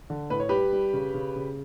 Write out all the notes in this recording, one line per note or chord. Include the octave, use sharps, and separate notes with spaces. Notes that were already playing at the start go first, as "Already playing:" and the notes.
D3
A2 B4
C#5
G3 G4 B4
G3
C#3
C#3
C#3